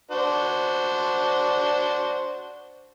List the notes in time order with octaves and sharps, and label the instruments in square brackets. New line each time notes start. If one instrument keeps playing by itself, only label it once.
[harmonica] D4 F#4 C5